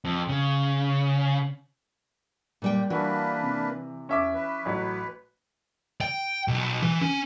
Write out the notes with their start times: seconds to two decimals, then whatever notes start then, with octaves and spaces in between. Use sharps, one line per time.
0.05 F2
0.28 C#3
2.62 A#2 G3 G5
2.90 E3 A#3 D4 F#4 B4
3.43 C3
4.09 E2 C#4 E5 D6
4.34 B4
4.66 A1 F#3
6.01 G5
6.48 B1
6.84 E3
7.01 C#4